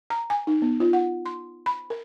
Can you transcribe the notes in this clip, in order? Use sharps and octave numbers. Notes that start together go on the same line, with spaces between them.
A#5
G#5
D#4
B3
F4
F#5
C6
B5
A#4